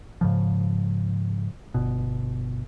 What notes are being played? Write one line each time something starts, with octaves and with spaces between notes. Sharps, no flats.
G#2 C#3 F3
G1 B2